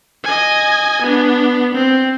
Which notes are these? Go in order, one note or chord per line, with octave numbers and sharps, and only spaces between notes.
D#5 G#5
B3 D4
C4